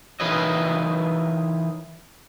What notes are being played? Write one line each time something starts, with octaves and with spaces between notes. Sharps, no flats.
E3 D#4 A#4 B4 C#5 D#5